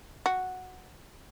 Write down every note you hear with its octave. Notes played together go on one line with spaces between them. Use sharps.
F#4